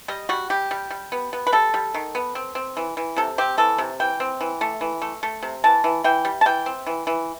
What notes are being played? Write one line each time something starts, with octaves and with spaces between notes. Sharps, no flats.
G3 D#5
G3 F#4
G3 G4
G3
G3
B3
B3
B4
G3 A4
G3
D#3
B3
C4
C4
E3
E3
C3 A4
C4 G4
E3 A4
C3
E3 G5
C4
E3
A3
E3
A3
A3
C3
E3 A5
E3
E3 G5
G3
A5
E3 G5
C4
E3
E3